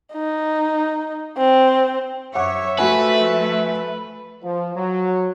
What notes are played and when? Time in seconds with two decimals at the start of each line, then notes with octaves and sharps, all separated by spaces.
0.13 D#4
1.38 C4
2.35 F#2 C#5 E5 F#5 D6
2.78 F3 A3 F#4 B4 G#5
4.43 F3
4.76 F#3